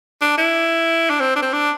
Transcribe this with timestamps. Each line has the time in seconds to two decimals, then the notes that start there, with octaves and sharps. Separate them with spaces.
0.21 D4
0.38 E4
1.10 D4
1.20 C4
1.36 D4
1.42 C4
1.53 D4